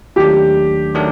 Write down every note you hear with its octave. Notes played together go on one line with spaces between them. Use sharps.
D#2 D#3 F#3 A3 D4 G4
D#3 F#3 A3 D4